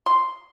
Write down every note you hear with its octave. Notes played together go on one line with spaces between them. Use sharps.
C6